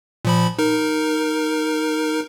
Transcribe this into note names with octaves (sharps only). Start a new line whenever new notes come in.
A#2 F3 B5
D#4 A#4